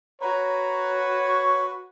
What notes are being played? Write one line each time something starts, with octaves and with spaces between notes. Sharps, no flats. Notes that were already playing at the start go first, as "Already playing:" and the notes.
F#4 B4 C#5 A#5
C#6